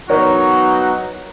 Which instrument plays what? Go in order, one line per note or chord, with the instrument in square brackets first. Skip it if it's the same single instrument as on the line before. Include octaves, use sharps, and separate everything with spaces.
[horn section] F#3 B3 D#4 F#4 [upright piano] A#4 C#5